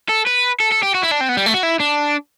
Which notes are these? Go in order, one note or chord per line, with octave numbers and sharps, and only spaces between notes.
A4
B4
A4
A4
G4
F#4
E4
D4
C4
B3
G3
A3
F#4
E4
D4